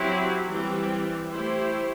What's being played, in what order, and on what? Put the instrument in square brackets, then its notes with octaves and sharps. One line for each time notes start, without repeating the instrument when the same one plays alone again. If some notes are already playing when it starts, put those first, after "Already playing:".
Already playing: [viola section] F#3 C4 E4 G4
E3 G3 C4
A3 E4 G4 C5